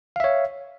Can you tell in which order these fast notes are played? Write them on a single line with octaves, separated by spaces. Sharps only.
F5 E5 C#5